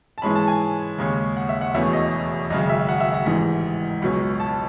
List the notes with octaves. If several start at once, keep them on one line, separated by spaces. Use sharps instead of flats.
A5
G#2 E3 G#3 C#4 B5
A5
G#5
D#2 C#3 G#3 C#4
F#5
E5
F#5
E1 E2 B2 A3 C#4 E5
D#5
G#1 F#2 C#3 D#5
E5
F#5
E5
F#5
A1 G#2 E3
C#2 B2 F#3 C#4
A5